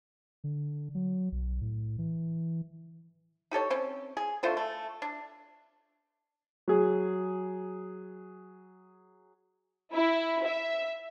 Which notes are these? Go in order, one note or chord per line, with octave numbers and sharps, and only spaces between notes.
D3
F#3
B1
A2
E3
D#4 G4 A4 C#5
C4 C#4
G#4
D3 A3 F4 C5
A3
D4
F#3 G#4
E4
E5